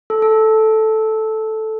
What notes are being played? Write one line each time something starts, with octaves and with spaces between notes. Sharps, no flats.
A4
A4